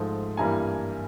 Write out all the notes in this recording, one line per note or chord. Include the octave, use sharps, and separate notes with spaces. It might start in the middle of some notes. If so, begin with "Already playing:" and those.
Already playing: G#2 F3 A3
G2 E3 G3 A#3 G#5 A#5